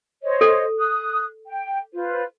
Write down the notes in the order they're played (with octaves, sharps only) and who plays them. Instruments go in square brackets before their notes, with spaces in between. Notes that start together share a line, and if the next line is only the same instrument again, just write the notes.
[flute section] C5 C#5 D#5
[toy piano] A4
[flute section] D#6 F#6
G5
F4 B4 C5